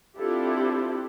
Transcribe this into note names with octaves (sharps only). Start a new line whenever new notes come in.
C4 D4 E4 F4 G4 A4